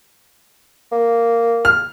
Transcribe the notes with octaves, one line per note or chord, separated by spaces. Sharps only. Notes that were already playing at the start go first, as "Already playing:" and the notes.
A#3
F6